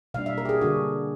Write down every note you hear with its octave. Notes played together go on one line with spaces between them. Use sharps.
B2 G3 A#3 D4 F5
E5
A#4
G4
G#4
D3 G3 A#3 D4 F#4